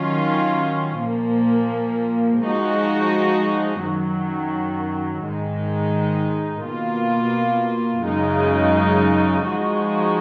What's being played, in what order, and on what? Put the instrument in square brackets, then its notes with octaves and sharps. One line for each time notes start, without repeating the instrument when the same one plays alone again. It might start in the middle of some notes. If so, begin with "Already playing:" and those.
Already playing: [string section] D#3 F#3 C#4 F4
A#2 F3 A#3
F3 G#3 D#4 F#4
F#2 D#3 F#3
G#2 D#3 G#3 D#4
B2 A#3 F4
F#2 C#3 G#3 D#4
F3 G#3 D#4 F#4